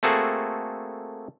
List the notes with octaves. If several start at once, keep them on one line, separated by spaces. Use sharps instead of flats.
A3 A#3 C4 F#4 G#4 A4